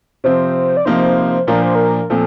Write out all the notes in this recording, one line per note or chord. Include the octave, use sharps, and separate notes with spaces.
C3 F3 C4 C5
D5
C3 F3 A#3 D#4 C5
A#2 F3 A#3 D4 A#4
C5
A#4
A#2 F3 C4 A4